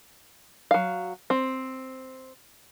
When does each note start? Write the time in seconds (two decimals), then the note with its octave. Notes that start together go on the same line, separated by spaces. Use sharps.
0.71 F#3 F5
1.30 C4